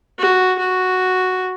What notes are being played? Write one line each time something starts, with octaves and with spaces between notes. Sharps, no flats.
F#4
F#4